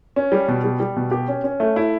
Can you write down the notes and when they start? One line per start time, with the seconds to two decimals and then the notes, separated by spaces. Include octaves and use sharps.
0.16 C#4
0.32 G3
0.48 B2
0.64 G3
0.80 G3
0.96 B2
1.11 G4
1.28 C#4
1.44 C#4
1.60 A3
1.76 E4